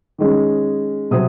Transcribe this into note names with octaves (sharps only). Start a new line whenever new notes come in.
D#3 G#3 C#4
C3 F#3 C4 D#6